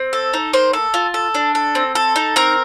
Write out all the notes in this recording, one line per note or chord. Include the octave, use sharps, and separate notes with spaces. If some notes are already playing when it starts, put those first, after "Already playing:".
Already playing: C4
A4
D#4
A#3 C5
A4
F4
A4
D4
A4
C4
A4
D#4
C4 A#4